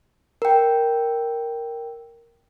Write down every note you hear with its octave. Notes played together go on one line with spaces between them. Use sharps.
A#4 G5